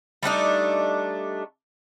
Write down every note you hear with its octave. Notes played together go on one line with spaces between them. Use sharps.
G3 A3 D4 D#4